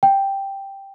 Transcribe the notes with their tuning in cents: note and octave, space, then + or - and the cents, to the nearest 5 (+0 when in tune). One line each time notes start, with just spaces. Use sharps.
G5 +0